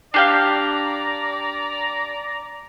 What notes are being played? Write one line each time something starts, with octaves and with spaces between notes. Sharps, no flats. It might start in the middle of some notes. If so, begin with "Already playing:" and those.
D4 G4 D5 F5 A#5